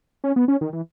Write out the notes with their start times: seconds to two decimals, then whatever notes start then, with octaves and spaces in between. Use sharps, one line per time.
0.24 C#4
0.36 B3
0.48 C#4
0.61 D#3
0.73 E3